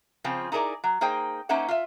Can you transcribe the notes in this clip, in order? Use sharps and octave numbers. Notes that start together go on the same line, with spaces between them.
C#3 F3 C4 C#4 F4
D#4 E4 G#4 A#4 D5
F#3
A#3 D#4 G#4 C5 D#5 G5
A#3 C#4 D#4 C5 E5 F#5
F4 E5